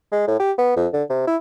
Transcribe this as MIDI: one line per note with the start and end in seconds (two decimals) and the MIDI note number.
0.12 0.27 56
0.27 0.38 45
0.39 0.52 67
0.58 0.73 59
0.76 0.87 41
0.93 1.03 50
1.10 1.26 48
1.27 1.36 64